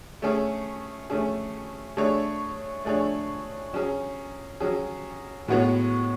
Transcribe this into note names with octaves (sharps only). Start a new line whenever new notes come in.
A3 C#4 G#4
A3 C#4 G#4
A3 D4 G#4 C#5
A3 D4 G#4 C#5
F#3 C#4 G#4
F#3 C#4 G#4
A2 G#3 B3 F#4 C#5